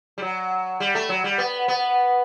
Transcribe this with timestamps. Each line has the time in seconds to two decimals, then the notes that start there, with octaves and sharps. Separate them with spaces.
0.18 G3
0.22 F#3
0.80 G3
0.95 A3
1.09 F#3
1.24 G3
1.38 B3
1.68 B3